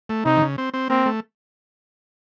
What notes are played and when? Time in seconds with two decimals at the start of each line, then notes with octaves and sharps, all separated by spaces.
0.09 A3
0.25 C3 D#4
0.37 D#3
0.42 C#3
0.58 C4
0.73 C4
0.90 A#3 C4
1.06 A3